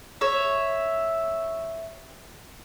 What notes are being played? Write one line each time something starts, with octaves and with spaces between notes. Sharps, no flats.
C#5 E5